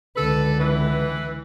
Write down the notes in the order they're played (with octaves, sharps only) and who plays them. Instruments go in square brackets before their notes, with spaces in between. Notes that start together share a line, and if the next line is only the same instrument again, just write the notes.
[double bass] C#2 D3 [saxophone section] A4 B4
[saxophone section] E3 B4